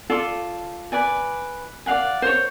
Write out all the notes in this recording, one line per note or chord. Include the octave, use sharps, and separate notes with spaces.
F4 A4 D5
B4 D5 G#5
D5 F5 F#5 G#5
C5 C#5